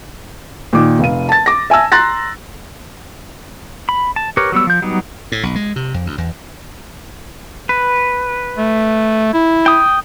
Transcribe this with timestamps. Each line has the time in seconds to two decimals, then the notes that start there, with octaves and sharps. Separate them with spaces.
0.73 A#2 D#3 D6
0.99 F1 F5 D#7
1.29 A5 A6
1.46 D6 A#6
1.70 E5 G#5 A5 E6
1.92 A#5 C6 F#6 A6 A#6
3.89 B5
4.16 A5
4.37 G4 A#4 B4 C#5
4.52 F#3 G3 B3 E6
4.67 F3 G6
4.82 F#3 G3 B3 D#4
5.32 A2
5.43 B1
5.56 G#3
5.76 C3
5.94 F2
6.06 D2
6.18 E2
7.69 B4
8.57 A3
9.34 E4
9.66 G5 D#6